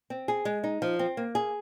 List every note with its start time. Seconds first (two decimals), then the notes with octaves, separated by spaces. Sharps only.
0.10 C4
0.28 G#4
0.45 G#3
0.64 D#4
0.82 F3
0.99 C4
1.17 A#3
1.35 G#4